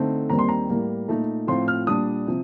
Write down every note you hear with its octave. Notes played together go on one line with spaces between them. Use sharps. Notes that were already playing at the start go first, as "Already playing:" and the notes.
Already playing: D3 A3 C4 D#4
D#2 D#3 G3 C4 A#5
C6
A#5
A2 G3 A#3
A#2 A3 D#4
A2 F3 C4 F4 C6
F6
A#2 G3 D4 D#6
C3 F3